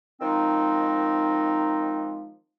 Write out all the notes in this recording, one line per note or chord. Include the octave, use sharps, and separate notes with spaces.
D#3 F3 G#3 C4 D#4